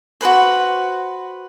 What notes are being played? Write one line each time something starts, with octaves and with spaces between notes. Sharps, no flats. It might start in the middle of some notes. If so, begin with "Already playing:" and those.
F#4 A4 B4 C5